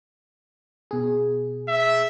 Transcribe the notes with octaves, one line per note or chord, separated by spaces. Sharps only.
B2 G#4
E5